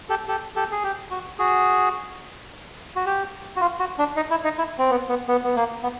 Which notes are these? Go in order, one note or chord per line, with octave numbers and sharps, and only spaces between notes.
G4 A4
G4 A4
G4 A4
G#4
G4
F#4
F#4 G#4
F#4
G4
F#4
F4
F#4
D4
D#4
E4
D#4
E4
C4
B3
B3
B3
B3
A#3
B3